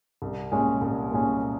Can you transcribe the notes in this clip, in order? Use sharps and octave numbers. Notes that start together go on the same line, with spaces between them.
C2
A#2 G#3 C#4
C2
A#2 G#3 C#4